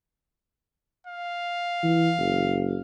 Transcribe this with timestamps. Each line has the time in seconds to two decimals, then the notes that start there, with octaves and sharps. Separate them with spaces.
1.07 F5
1.83 E3
2.18 F#1